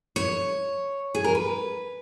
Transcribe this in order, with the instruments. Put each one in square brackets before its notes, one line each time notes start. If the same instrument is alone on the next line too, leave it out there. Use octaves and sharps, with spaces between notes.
[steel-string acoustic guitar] C#5
G#4
A#4
B4